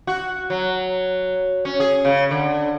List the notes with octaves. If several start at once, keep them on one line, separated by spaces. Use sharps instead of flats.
F#4
F#3
C#4
G#4
C#3
D3